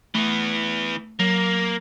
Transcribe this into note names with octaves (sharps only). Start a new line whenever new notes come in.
E3 A3 B3
F#3 A#3